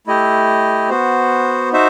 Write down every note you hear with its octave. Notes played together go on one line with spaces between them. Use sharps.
A3 E4 G4 D#5
B3 F#4 C5
D#4 F#4 C5 E5